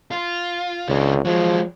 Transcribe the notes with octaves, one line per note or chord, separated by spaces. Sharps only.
F4
C#2 C#3 D4
F3 F#3 G#3